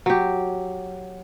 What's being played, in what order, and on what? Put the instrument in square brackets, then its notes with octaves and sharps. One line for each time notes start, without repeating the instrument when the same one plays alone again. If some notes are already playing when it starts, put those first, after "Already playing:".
[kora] F#3 G4